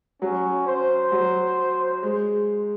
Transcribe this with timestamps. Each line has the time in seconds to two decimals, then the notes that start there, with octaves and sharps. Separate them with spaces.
0.22 F#3 C#4
0.67 C5
1.12 F#3
2.03 G#3